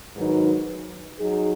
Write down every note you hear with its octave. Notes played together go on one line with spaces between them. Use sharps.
G#2 D#3 F#3 D#4 B4
F#3 D#4 G#4